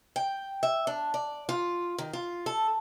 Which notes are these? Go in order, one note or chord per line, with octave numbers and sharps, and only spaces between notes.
G5
E5
D4
D5
F4
D#3
F4
A4